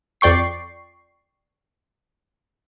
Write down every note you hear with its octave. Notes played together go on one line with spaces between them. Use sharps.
F2 D5 G5 C#6 C7